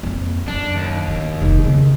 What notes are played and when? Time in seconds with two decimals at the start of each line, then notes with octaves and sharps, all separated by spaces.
0.03 F2 A#3
0.48 F#2 D4
0.76 D#2
1.08 G1
1.41 F1 D#4
1.64 C#3 B3